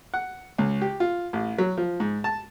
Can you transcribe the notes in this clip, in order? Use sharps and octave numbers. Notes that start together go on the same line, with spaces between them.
F#5
C#2
G4
F4
A1
F#3
F3
G#2
A5